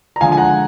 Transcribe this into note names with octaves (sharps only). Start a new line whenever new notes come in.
A#5
D3 F3 G#3 F5 G#5
G#5
F#5 A#5